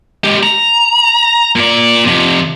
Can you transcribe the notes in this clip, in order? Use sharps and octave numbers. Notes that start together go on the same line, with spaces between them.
G#3 G4
A#5
A#2 D5
F2 C3